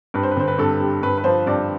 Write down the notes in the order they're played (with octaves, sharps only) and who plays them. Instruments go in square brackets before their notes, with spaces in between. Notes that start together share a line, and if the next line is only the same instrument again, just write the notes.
[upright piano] G2 B4
C5
B4
D3 C5
B4
G2 A4
G3
G2 B4
B4
F3 C5
G2 D5